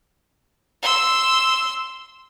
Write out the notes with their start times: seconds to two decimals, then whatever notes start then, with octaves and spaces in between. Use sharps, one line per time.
0.82 C6 E6